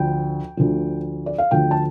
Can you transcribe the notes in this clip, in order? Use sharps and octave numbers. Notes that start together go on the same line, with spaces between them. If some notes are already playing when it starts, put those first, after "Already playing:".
Already playing: D2 D3 F3 G5
D2 D3 F3
D5
F5
D2 D3 F3 G5
A5